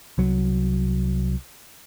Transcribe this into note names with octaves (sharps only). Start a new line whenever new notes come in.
C2 F#3